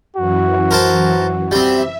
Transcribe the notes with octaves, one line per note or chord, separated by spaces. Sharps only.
F#2 E3 F#4
A#4 C5 A5
G3 C4 E5